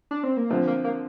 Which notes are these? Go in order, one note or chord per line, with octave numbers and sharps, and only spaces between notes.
D4
C4
A#3
D3 F3 A3 C4
A#3
A#3